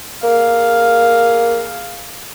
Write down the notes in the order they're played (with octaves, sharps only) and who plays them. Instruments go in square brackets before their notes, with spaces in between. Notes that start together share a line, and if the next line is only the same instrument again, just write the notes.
[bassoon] A#3 [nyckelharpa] G#4 F5